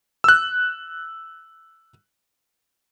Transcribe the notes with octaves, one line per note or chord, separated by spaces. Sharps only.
E6 F#6